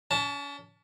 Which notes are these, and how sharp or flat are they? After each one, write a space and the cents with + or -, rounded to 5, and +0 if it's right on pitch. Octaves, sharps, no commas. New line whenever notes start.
C#4 +40 A5 +0